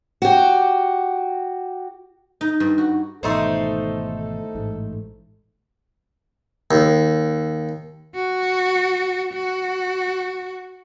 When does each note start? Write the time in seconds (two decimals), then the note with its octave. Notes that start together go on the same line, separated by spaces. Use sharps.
0.22 F#4 G4
2.41 D#4
2.60 G2
2.78 F#4
3.23 G#1 B2 E3 A3 D#4 A4 C5
4.55 A1 G#2
6.71 D#2
8.15 F#4
9.33 F#4